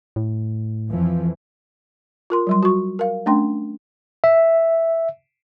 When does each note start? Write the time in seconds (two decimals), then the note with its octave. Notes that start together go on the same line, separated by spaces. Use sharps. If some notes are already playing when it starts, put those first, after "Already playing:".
0.16 A2
0.89 F2 E3 F3
2.30 F4 A#4 C6
2.47 F#3 G3 C6
2.63 F#4 C#6
2.99 A#4 F5
3.26 A3 C#4 D4 G5 C6
4.24 E5